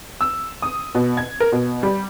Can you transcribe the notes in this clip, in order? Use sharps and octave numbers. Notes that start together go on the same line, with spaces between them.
E6
D#6
B2
G#6
A#4
B2
G3